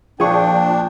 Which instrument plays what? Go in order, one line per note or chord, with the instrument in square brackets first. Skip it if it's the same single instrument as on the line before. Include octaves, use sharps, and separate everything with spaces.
[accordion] A#2 D4 [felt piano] F3 [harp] G#4 C#6 [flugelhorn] G5